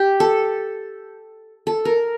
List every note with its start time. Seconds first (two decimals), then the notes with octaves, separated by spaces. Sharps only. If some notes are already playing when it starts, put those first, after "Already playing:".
Already playing: G4
0.20 A4
1.67 A4
1.85 A#4